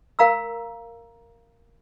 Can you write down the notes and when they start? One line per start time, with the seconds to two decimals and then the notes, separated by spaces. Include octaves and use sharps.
0.19 A#4 F5 A#5 E6